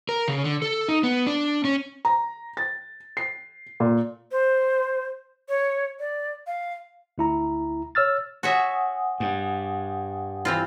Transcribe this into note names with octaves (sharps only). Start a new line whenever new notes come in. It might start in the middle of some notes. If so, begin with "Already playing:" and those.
A#4
C#3
D3
A4
D#4
B3
D4
C#4
A#5
A6
C7
A#2
C5
C#5
D5
F5
D2 E4 A#5
C#5 E6 F6 A6
F#4 C#5 E5 F#5 G#5 D#6
G2
E3 C4 E4 F4